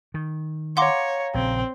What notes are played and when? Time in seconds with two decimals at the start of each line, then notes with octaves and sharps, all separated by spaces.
0.14 D#3
0.77 C#5 F5 F#5 A#5 C6 D6 A#6
1.34 A#1 C#3 C4